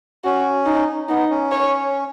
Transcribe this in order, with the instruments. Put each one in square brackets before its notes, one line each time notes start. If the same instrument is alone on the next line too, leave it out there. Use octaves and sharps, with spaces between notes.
[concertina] C#4 [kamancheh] F#4
[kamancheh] D#4
[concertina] B3 [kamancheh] D#4
[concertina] C#4
[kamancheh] C#5